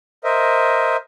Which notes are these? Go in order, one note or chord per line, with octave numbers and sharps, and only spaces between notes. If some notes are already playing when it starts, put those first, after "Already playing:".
A#4 C5 D#5 E5